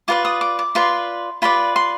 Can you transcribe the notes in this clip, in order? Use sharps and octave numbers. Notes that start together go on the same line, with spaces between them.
F4 B4 D5 D6
D#6
D6
D6
F4 B4 D5 C6
F4 B4 D5 B5
C6